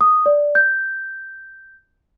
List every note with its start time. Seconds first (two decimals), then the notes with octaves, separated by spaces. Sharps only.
0.01 D#6
0.26 D5
0.55 G6